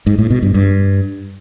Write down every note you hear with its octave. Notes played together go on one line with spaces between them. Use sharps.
G#2
A2
B2
G2
G2